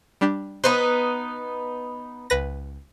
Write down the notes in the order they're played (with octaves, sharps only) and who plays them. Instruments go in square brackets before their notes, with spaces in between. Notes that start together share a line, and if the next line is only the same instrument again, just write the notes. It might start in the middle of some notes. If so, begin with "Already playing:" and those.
[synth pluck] G3 D4 G4
[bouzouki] B3 D#4 B4 [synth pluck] C5 C6
[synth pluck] C#2 B4 A#6